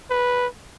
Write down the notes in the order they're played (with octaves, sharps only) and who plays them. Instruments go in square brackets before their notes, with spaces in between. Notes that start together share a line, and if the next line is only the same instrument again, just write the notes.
[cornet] B4